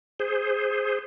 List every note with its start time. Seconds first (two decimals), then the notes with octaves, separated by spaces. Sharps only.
0.20 G#4 C5